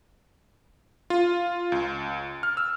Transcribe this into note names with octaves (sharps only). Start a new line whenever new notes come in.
F4
C#2
F6
E6